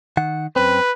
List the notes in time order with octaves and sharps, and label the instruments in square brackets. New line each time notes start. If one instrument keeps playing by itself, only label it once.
[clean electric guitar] D#3 F#5
[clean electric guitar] F#2 C4 [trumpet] B4